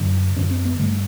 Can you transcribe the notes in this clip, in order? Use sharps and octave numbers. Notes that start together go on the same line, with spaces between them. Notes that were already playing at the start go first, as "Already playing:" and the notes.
Already playing: F#2 D3
F#2 D3 C#4
C4
B3
G2 D3 A3